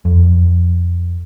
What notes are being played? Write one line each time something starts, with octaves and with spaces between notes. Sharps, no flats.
F2